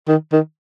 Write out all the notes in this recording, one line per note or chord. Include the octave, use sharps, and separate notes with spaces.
D#3
D#3